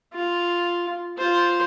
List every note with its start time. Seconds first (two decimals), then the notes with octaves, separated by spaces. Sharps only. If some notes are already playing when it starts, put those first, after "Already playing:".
0.13 F4
1.17 F4 C5